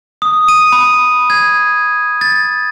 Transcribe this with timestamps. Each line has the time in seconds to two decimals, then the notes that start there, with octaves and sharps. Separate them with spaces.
0.22 D#6
0.48 D#7
0.72 B5
1.30 G#6
2.21 A6